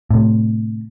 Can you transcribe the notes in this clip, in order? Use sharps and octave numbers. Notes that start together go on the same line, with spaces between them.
A2 C3